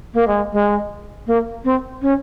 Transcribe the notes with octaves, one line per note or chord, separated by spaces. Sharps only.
A#3
G#3
G#3
A#3
C4
C#4